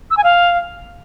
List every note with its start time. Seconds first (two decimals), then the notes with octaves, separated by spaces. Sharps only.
0.11 E6
0.17 G#5
0.24 F5